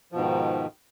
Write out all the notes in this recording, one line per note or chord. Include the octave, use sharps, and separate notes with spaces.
G#2 B2 D#3 F3